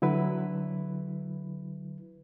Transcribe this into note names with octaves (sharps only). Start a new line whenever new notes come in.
D3 F#3 E4 B4